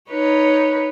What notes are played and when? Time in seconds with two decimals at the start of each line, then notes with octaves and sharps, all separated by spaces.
0.10 D#4 B4 C#5